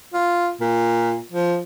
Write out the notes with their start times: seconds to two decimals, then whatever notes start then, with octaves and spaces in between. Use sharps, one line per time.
0.14 F4
0.61 A#2
1.32 F3